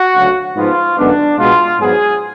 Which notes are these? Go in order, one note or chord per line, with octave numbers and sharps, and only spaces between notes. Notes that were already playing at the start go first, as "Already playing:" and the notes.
Already playing: F#4
D2 C#3 F#3
G#2 F3 B3 F4
F#2 D3 G#3 B3 D4
B2 G#3 B3 F4
G#2 F#3 B3 G#4